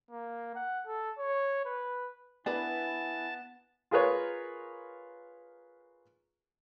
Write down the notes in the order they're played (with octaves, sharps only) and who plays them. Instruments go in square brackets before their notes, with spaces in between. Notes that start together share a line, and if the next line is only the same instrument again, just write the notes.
[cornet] A#3
F#5
A4
C#5
B4
[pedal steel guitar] B3 [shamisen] D4 A#4 B4 [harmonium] E4 G#5 [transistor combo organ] A5
[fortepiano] F4 G#4 A#4 B4 C#5